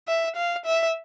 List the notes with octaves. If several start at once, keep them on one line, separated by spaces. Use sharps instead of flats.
E5
F5
E5